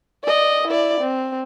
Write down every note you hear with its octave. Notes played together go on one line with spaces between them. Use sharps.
D5 D#5
E4 D5
C4